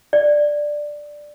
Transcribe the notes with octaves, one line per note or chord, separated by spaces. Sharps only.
D5